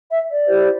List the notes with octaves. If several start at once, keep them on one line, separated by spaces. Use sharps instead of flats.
E5
D5
E4 G4 C5